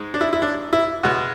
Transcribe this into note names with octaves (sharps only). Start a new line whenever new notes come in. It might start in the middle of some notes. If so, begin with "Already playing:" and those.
Already playing: G#2 G#3
D4
E4
E4
D4
E4
B2 G#3 F#4